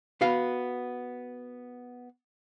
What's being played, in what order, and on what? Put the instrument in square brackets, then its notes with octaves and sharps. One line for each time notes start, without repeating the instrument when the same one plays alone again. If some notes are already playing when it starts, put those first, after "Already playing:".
[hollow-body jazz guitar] B3 F#4 F5